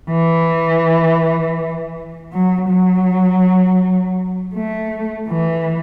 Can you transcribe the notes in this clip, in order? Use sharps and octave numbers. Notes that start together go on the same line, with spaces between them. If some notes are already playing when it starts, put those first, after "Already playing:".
E3
F#3
F#3
A3
E3